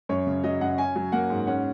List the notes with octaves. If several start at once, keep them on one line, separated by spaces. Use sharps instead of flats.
F#2 C#5
C#3
F#3 D#5
F#2 F#5
C#4 G#5
F#3
A#3 F#5
G#2
C#4 F#5